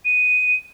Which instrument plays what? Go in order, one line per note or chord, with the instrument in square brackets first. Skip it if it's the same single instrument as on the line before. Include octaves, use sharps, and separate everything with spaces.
[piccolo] D#7